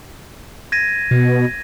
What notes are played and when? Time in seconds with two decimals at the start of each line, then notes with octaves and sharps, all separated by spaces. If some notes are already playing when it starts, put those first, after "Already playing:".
0.72 G#6 A#6 D#7
1.11 B2